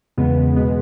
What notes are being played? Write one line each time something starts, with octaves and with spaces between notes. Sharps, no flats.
E2 C#3 G#3 B3
B2 G#3 B3